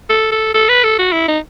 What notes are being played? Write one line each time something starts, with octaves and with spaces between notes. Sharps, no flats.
A4
A4
A4
B4
A4
F#4
E4
D#4